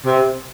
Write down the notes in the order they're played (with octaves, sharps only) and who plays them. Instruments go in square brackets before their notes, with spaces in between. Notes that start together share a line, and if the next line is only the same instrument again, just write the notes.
[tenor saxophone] C3